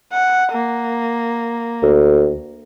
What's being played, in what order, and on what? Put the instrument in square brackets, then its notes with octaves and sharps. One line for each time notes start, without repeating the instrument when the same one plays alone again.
[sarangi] F#5
A#3
[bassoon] D2